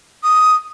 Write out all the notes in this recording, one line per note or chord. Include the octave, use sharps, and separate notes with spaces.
D#6